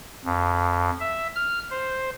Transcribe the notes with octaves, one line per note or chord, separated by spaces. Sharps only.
F2
E5
F6
C5